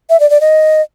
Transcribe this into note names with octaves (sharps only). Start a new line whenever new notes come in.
E5
D5
D5
D#5